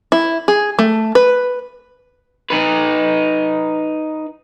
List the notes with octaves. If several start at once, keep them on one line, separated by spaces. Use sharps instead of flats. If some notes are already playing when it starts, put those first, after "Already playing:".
E4
G#4
A3
B4
D#4 B4